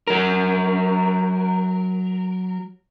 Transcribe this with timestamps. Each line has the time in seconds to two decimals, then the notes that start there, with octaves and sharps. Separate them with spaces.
0.07 F#3 A#4